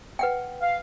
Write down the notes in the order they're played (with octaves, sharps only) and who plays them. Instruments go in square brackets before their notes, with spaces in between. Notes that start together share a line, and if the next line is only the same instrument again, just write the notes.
[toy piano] B4 F#5 G5
[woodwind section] F5